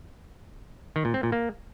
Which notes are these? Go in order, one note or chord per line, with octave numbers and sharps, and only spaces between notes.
D#3
A#2
C4
A#2
A#3